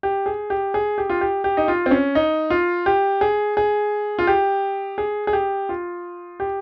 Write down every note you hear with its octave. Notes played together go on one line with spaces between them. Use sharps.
G4
G#4
G4
G#4
G4
F4
G4
G4
D#4
F4
C4
C#4
D#4
F4
G4
G#4
G#4
F4
G4
G#4
G#4
G4
F4
G4